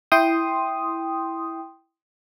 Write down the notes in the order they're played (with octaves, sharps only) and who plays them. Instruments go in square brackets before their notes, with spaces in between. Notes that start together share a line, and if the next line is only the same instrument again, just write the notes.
[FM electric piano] E4 G5 C6 D#6